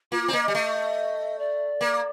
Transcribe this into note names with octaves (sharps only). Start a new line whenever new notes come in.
A#3 F4
F4
C4
A#3 D#5
G3 D#5
A3
D5
A#3